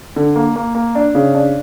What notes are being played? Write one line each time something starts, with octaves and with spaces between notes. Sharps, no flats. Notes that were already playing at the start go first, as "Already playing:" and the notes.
D3
A#3
A#3
A#3
D4
C#3
D4